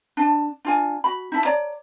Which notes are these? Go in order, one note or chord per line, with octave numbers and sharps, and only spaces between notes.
D4 A5
D4 F4 G#5
F#4 B5
D#4 E4 A5
C#5 D5 A#5